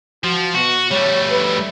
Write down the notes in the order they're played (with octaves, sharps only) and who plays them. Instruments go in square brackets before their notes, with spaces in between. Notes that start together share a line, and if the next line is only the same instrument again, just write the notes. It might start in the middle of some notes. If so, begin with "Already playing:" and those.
[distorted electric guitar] F3 [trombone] F#4
[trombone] B2 [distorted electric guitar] F#4
[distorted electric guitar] G3 A3 [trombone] C#5
[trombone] B4